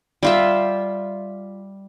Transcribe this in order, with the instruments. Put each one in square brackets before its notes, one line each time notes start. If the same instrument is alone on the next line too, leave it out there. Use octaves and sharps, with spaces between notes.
[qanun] G3 F4 E5